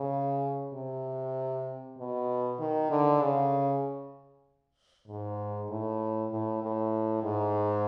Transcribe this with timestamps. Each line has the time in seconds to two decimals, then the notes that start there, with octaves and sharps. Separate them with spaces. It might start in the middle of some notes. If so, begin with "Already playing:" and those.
Already playing: C#3
0.74 C3
1.99 B2
2.60 D#3
2.91 D3
3.22 C#3
5.08 G#2
5.70 A2
6.31 A2
6.63 A2
7.24 G#2